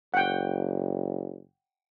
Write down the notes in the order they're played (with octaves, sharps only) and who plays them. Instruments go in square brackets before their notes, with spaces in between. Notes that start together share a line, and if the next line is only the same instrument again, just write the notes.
[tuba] F#1 [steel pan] F#5 G5